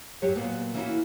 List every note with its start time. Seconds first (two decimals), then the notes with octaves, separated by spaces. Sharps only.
0.22 F#2 F#3 G4 C#5
0.35 A#2 F#3 A#3 B3
0.74 E3 A#3 C#4 D#4 E4 F#4